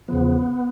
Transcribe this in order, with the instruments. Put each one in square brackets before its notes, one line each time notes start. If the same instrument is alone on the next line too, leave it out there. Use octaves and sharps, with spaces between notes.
[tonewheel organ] E2 C#3 F3 B3